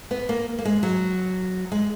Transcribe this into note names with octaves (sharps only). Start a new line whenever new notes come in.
B3
A#3
A#3
G#3
F#3
G#3